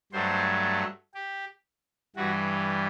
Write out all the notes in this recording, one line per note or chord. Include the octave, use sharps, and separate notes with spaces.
G2 F#3 A3 C5
G4
G2 E3 G3 F#4